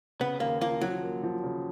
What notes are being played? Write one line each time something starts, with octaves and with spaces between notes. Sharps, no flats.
C#3 B3
D#2 A#3
F3 A#3
F3 F#3
A#3
F3
C#3